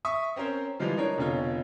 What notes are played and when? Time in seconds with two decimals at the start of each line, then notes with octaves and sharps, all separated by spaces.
0.05 E5 C#6 D#6
0.36 C4 C#4 A#4 C5 C#5
0.80 E3 F3 G3 G#3 F4
0.97 D4 D#4 A#4 C#5
1.18 F1 B2 D3 F4 C#5